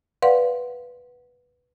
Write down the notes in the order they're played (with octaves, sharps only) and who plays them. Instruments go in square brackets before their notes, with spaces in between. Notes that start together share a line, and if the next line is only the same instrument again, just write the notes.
[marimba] B4 D5 F5 F#5 C6